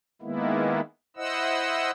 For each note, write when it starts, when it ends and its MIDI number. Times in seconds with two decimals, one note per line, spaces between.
0.22 0.81 51
0.22 0.81 56
0.22 0.81 58
0.22 0.81 59
0.22 0.81 64
1.17 1.91 64
1.17 1.91 72
1.17 1.91 75
1.17 1.91 78
1.17 1.91 88